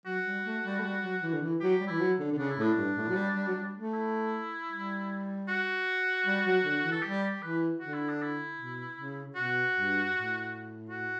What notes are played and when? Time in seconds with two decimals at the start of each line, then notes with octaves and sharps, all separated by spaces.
0.06 F#3 F#4
0.25 G3
0.45 A3
0.64 G3
0.79 A3
0.83 G3
1.03 F#3
1.22 E3
1.33 D3
1.42 E3
1.60 F#3 G4
1.81 G3
1.87 E3 E4
2.00 F#3
2.19 D3
2.33 D3
2.38 C#3 D4
2.50 E4
2.57 A2 D4
2.77 G2
2.97 A2
3.08 F#3
3.16 G3
3.36 G3
3.47 F#3
3.55 G3
3.74 A3
3.93 E4
4.70 G3
5.48 F#4
6.26 G3
6.45 F#3
6.64 D3
6.83 E3
6.92 A4
7.03 G3 G4
7.23 G4
7.42 E3 B4
7.80 D3 F#4
7.94 E4
8.09 D4
8.22 E4
8.58 B2
8.96 C#3
9.36 B2 F#4
9.74 G2
10.13 A2
10.90 F#4